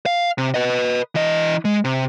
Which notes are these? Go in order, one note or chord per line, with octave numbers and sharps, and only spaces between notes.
F5
C3
B4 D#5
E3 D#5
G#3
C3